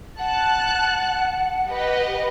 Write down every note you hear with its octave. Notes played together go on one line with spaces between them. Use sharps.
F#5 A5 F#6
G4 B4 D#5